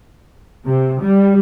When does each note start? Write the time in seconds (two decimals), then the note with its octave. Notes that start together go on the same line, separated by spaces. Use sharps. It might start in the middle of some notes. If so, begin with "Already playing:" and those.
0.67 C3
1.02 G3